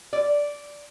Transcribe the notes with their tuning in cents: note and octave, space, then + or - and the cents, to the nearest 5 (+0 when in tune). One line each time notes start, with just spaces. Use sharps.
D5 -10